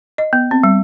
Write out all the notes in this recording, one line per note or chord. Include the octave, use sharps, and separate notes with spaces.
D#5
B3
C4
G3